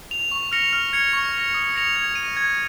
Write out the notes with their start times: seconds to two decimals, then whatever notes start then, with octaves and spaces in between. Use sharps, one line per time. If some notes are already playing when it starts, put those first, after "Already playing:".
0.11 F7
0.31 C#6
0.52 F6 A#6 C#7 F7
0.73 F6
0.93 G#6 C#7 F7
1.13 C#6
1.34 A#6 F7
1.54 D#6
1.75 A#6 C#7 F7
1.96 G#6
2.15 D#7
2.37 G#6